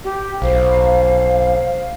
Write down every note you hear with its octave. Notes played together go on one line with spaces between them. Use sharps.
G4
B1 C5 F5